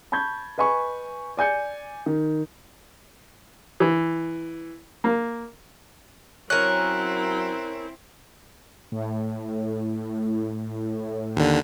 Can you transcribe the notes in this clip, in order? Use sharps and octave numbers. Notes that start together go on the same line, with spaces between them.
A5 B5 C#6 G6 G#6
B4 D#5 G#5 B5 C#6
D5 G#5 G6 C#7
D#3
E3
A#3
F#3 C4 C#4 E4 A#4 F#6
A2
D#2 D3